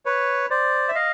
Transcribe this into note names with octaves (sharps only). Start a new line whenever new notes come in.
B4 C#5
C5 D5
E5
D#5 F5